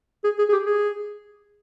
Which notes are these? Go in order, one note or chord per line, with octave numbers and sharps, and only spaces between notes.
G#4
G#4
G#4
G4
G#4